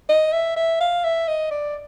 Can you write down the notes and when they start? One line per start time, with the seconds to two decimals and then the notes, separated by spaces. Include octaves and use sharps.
0.09 D#5
0.33 E5
0.56 E5
0.80 F5
1.04 E5
1.28 D#5
1.51 D5